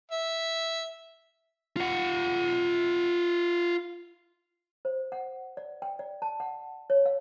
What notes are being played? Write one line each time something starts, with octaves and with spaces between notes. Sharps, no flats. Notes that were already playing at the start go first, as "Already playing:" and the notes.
E5
F4 F#5
C5
F#5
D5
G5
D5
A5
F#5
C#5
F5